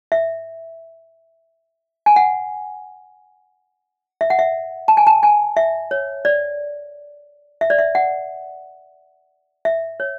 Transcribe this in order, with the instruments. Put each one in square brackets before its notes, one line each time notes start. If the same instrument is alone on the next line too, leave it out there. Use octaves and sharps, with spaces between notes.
[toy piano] E5
G#5
F#5
E5
F#5
E5
A5
G#5
A5
G#5
E5
C#5
D5
E5
D5
E5
F#5
E5
C#5